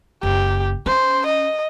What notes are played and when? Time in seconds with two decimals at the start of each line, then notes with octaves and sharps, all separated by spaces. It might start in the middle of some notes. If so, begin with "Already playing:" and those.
0.23 F#1 G4
0.86 C#4 C5
1.26 D#5